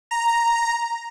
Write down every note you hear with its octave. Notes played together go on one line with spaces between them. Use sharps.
A#5